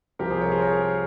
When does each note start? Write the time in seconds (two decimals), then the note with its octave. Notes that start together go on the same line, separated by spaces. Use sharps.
0.19 C2 C3 F3 C4 G4 A#4
0.30 G#4 C5
0.41 A#4 C#5
0.52 G#4 C5
0.62 A#4 C#5